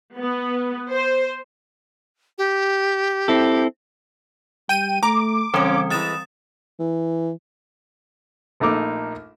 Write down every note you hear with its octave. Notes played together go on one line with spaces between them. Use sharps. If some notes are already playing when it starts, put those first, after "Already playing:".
B3
C5
G4
C4 E4 A4
G3 G5 D#7
A3 A#5 D6
F#2 C#3 E3 G3 C4 C#4
E3 G#3 D#6 A6 E7
E3
A#1 A3 A#3 D#4 D6 E6